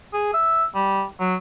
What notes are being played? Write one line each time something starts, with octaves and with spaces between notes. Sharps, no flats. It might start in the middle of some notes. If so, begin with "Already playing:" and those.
G#4
E5
G3
F#3